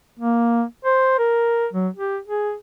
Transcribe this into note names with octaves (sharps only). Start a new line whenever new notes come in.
A#3
C5
A#4
F#3
G4
G#4